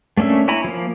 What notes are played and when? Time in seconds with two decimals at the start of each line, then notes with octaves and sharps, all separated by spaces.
0.17 A3 A#3 C#4 D4 E5
0.48 E4 C#5 G#5 A#5 B5
0.64 F3 A#3